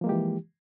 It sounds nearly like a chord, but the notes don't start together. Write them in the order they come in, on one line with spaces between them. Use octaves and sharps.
F3 A#3 G#3 G4 E3